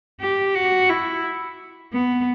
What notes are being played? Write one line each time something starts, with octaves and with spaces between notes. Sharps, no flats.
G4
F#4
E4
B3